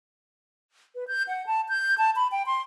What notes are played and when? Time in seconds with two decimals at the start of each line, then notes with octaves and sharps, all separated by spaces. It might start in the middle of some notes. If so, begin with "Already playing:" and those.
0.95 B4
1.08 G6
1.28 F#5
1.46 A5
1.69 G6
1.98 A5
2.16 B5
2.31 G5
2.46 C6